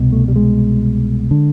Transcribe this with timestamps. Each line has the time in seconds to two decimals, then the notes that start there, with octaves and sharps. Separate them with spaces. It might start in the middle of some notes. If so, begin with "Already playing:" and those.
Already playing: C2 B2
0.12 A3
0.28 G3
0.36 G#3
1.31 D3